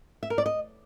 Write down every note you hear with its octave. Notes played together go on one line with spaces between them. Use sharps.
E5
A#4
D5
D#5